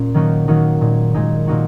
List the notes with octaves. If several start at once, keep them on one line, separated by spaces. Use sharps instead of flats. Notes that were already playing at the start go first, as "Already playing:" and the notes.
Already playing: A#2 C#4
D#3 F#3 A#3 D#4 F#4
D#3 F#3 A#3 D#4 F#4
A#2 G#3 D#4
A#2 G#3 D#4
A#2 A#3 D#4 F#4